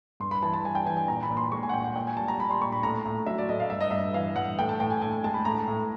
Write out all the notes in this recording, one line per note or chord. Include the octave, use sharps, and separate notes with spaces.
G2 C6
B5
E3 A5
A5
G3 G#5
G5
E3 G#5
G#5
A#2 A#5
B5
A#2
C6
G#3 C#6
G#5
F#5
A#2 G5
F#5
A#2 G5
G#5
G3 A5
A#5
G3 B5
C6
A#2 C#6
B5
A2 A#5
A2
F#3 E5
D5
A2 D#5
F5
G2 E5
D#5
G2 E5
E3 F5
G2 F#5
A2 G5
A5
A2 G5
G#5
A2 G#5
G#5
G#3 A5
B5
A2 A#5
A2